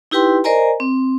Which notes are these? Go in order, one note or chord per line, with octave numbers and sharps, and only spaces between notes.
D#4 E4 G4 B4 G5 C6
A#4 C5 D5 D#5 G#5 A#5
C4